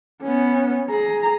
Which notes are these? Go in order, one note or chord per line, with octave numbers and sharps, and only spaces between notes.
B3 C#4
G#4 A#5